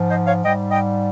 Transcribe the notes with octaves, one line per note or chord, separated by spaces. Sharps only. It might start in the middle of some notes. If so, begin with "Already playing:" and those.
Already playing: G#2 F3
C5 D#5
C#5 F5
G#2 G3 D#5 G5
D#5 G5